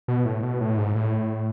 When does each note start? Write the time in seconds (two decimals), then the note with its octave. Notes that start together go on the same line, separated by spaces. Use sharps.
0.08 B2
0.25 A2
0.43 B2
0.61 A2
0.77 G#2
0.95 A2